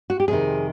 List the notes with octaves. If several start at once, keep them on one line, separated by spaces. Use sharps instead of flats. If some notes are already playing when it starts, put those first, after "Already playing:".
F#4
G4
F2 C3 D#3 G#4